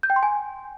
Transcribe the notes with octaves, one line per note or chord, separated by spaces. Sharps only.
G6
G5
C6
G#5